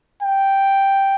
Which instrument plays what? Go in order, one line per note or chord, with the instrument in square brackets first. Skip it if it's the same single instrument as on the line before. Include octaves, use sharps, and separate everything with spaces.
[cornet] G5